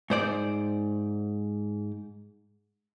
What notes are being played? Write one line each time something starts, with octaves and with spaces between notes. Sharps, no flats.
G#2 C5 D5